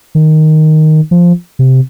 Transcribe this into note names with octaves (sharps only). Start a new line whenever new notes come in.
D#3
F3
C3